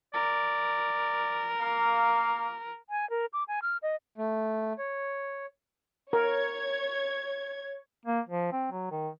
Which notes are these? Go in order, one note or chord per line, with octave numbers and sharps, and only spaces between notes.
A#4 D5
A#3 F5
G#5
A#4
D6
G#5
F6
D#5
A3
C#5
A#4 C#5 G#6
A#3
F3
C4
F#3
D#3